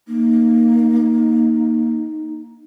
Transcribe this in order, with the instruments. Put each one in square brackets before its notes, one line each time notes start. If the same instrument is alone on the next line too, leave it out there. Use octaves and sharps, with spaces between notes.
[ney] A#3 [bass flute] D#4